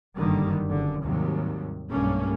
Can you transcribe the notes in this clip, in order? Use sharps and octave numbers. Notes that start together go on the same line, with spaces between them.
F#1 G2 D3 D#3 G3
F#1 D3
D#2 G#2 C3 F#3 G3
B1 G2 A3 A#3 C#4